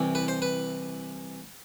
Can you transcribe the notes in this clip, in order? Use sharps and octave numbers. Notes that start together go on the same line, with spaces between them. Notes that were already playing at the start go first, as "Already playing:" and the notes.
Already playing: C2 C3 E3
B4
C5
B4